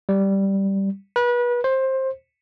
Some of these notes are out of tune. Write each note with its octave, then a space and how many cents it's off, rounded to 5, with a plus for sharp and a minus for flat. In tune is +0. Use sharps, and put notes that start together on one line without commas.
G3 -5
B4 -30
C5 +15